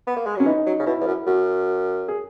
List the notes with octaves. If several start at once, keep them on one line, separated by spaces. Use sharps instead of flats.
B3
A#3
G#3
F#3 C#4
E3 D#4
F#3
C#3
B2 E4
E2
F#2
F#2 F#4
G#4